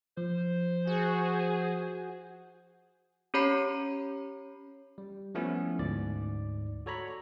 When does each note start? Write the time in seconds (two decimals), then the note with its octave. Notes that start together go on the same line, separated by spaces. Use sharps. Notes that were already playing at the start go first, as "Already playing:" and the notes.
0.17 F3 C5
0.87 F#4 G#4
3.34 C#4 G4 C#5 A#5 B5 C7
4.98 G3
5.35 F3 A3 B3 C#4 E4
5.79 D2 G#2 D5
6.86 F#4 A4 C#5 D5 A#5 B5